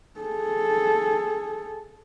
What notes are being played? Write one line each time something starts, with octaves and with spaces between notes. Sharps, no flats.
G#4 A4